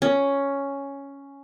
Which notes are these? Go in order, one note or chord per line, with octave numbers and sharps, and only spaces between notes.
C#4